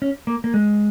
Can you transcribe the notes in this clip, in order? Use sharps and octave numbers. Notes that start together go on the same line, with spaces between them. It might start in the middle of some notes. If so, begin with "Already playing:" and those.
C#4
A#3
A#3
G#3